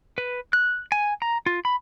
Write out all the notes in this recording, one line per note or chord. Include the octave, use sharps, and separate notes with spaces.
B4
F#6
G#5
A#5
F4
B5